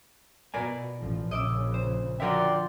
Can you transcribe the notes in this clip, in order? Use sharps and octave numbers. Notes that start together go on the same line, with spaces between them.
B2 A#4 D5 G#5
A1 F3
A#1 C#3 D#5 D6 E6
C5
D3 F3 F#4 A#4 D5 E5 G5 C6